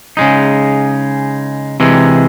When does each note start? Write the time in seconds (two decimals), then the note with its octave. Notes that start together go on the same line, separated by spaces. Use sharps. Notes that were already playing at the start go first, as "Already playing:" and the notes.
0.17 C#3 G#3 D#4
1.80 C3 E3 G#3